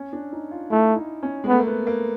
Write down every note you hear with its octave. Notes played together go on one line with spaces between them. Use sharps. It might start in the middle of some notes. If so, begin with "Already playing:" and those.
Already playing: C#4
D4
D#4
F4
A3 E4
D#4
C#4
G#3
A3 B3
A#3
B3
A#3